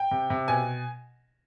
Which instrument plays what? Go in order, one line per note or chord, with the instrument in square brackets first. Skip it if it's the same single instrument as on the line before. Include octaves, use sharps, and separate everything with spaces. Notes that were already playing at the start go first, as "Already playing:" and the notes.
Already playing: [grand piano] G5
C3
C3
B2 G#5